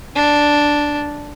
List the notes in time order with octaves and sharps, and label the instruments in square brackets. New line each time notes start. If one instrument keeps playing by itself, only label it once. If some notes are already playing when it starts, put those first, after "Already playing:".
[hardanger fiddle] D4